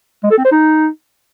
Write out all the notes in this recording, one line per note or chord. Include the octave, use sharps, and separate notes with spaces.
G#3
A4
C4
C5
D#4